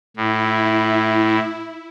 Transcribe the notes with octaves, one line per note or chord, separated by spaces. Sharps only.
A2 E4